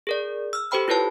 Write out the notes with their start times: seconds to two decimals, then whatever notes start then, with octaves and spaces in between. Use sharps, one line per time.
0.07 G#4 A#4 D5
0.53 E6 F6
0.71 G4 A4 C5 G5 B5 F6
0.88 E4 F4 B4 C#5 A5